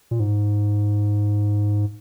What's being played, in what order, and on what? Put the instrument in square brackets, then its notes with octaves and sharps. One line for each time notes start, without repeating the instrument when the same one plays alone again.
[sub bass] A#2
G#2